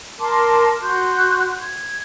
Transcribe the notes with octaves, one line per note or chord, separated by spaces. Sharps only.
A#4 A5 C6 D6
F#4 C6 F#6 G6
G#6